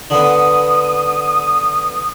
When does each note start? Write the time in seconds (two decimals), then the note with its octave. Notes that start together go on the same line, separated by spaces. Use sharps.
0.10 D3 B3 D#6